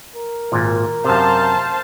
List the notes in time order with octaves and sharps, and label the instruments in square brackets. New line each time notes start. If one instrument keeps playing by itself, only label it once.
[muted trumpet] A#4
[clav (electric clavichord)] G#1 A#2
[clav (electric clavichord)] F#2 C3 [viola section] C5 F5 A5